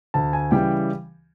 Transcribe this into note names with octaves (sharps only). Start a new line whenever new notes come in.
D2 A5
G#5
C#3 E3 G3 G5